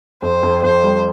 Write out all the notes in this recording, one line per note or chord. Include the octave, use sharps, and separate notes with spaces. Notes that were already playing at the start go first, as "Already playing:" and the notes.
F2 C5
F2
F2 C5
G3